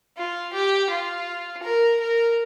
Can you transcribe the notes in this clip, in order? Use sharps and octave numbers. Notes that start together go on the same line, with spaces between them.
F4
G4
F4
A#4
A#4